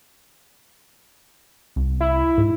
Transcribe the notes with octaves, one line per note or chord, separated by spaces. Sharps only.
C2
E4
G#2